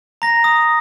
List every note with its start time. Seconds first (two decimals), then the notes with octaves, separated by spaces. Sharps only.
0.22 A#5 A#6
0.44 D#6